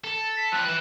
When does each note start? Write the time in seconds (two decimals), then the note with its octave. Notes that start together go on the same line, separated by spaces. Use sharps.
0.04 A4
0.37 B6
0.52 F3 G3 F#6
0.65 B4 E5